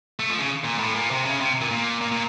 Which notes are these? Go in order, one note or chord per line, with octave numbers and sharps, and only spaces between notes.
A3
F3
C#3
A#2
A2
A#2
C3
C#3
C3
A#2
A#2
A#2
A#2